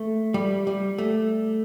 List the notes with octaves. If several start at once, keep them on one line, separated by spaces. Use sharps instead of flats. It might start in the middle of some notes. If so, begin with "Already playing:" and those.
Already playing: A3
G3
G3
A3